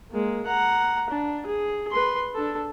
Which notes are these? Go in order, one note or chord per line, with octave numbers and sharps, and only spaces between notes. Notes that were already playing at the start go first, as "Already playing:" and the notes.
G#3 A#3
F#5 A#5
D4
G#4
B4 C6
D4 A4